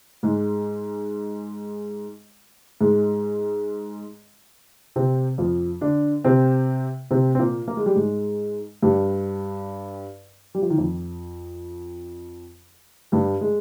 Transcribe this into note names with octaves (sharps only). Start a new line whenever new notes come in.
G#2 G#3
G#2 G#3
C3 C4
F2 F3
D3 D4
C3 C4
C3 C4
C4
A#2 A#3
A#3
G#3
G3
G#2 G#3
G2 G3
G3
F3
D#3
F2 F3
G2 G3
G#3